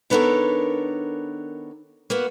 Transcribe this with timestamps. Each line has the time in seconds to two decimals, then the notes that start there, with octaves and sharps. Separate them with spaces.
0.10 D#3 B3 D4 A4 A#4 C#5
2.10 A#3 B3 F#4